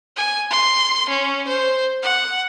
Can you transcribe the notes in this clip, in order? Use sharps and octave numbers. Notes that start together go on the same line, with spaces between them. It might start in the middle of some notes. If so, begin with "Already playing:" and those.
G#5
C6
C#4
C5
F#5